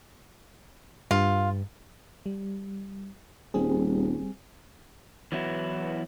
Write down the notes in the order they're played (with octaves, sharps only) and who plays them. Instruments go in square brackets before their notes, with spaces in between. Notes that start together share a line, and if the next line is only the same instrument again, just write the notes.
[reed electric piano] G2 [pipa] F4
[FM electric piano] G3
[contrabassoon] D#1 [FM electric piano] G3 C4 G#4
[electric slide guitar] E3 F#3 B3 E4 F#4